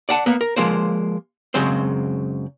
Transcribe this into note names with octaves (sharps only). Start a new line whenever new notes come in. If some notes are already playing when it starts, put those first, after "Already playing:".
D5 F#5 A5
A#3 B3
A#4
F3 G#3 A#3 C5
F#2 C#3 F#3 G#3 C4 C5